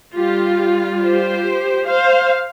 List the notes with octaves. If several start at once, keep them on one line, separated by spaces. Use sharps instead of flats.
G3 F4 G4
G4 C5
C5 F5